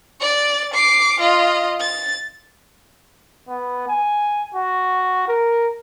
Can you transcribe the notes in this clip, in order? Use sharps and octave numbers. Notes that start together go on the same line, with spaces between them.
D5 A6
D6 C7
F4 D#5
A6
B3
G#5
F#4
A#4